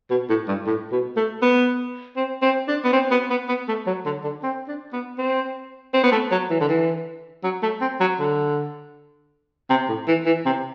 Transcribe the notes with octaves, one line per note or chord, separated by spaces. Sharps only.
B2
A2
G2
A2
B2
A3
B3
C4
C4
D4
B3
C4
B3
B3
B3
A3
F#3
D3
D3
C4
D4
B3
C4
C4
B3
A3
F#3
E3
D3
E3
F#3
A3
C4
F#3
D3
C3
A2
E3
E3
C3